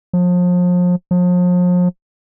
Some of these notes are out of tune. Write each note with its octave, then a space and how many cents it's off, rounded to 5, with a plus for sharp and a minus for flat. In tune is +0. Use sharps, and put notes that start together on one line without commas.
F3 +35
F3 +40